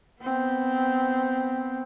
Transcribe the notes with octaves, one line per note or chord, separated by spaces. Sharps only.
B3 C4